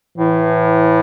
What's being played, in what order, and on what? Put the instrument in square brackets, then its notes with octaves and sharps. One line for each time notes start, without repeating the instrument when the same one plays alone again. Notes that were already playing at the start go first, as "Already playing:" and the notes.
[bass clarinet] A2 [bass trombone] E3